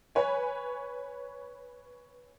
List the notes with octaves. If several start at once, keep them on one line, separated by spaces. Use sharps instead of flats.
B4 C#5 G#5